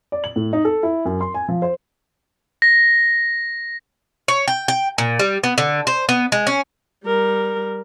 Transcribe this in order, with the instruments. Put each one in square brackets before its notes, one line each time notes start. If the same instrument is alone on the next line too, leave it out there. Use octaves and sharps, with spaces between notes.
[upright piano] D5
F#7
A2
D#4
A4
E4
F#2
C6
G#5
F3
C5
[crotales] A#6
[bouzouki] C#5
G5
G5
A#2
G3
B3
D3
C5
B3
G#3
C#4
[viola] G3 A#4